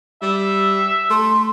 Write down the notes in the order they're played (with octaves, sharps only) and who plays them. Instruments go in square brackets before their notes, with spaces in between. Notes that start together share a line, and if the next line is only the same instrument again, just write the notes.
[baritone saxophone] G3 [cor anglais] E5
[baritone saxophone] A3 [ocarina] C6